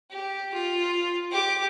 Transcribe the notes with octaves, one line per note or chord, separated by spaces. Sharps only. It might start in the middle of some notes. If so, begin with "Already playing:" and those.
G4
F4
G4 D6